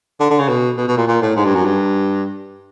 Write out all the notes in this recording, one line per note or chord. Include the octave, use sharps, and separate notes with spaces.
D3
D3
C#3
B2
B2
B2
A#2
A#2
A2
G#2
G2
F#2
G2